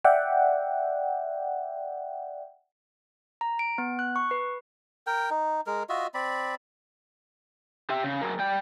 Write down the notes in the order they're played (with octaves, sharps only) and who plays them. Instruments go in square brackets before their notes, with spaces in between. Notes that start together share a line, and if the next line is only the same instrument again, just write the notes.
[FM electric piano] D5 E5 F#5 G5
[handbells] A#5
D7
B3
F#6
C#6
B4
[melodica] A#4 G5
D#4
G#3 A#4
F4 F#4 D#5 E5
C4 D5 B5
[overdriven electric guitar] G4 E5
C#3
F#3 A#3
G3 G5